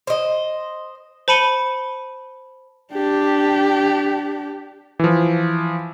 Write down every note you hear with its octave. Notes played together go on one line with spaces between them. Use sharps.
C5 D#5
C5 A5 B5 C#7 D#7 G7
D4 G4
E3 F3